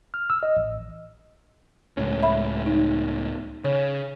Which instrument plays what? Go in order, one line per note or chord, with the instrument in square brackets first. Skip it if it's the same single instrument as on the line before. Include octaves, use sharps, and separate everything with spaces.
[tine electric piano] F6
E6
D#5
A1
[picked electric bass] C#2 A2 C#4
[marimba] E5 B5
D#4
[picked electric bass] C#3 [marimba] C#5